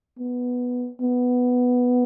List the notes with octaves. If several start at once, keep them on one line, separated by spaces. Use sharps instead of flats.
B3
B3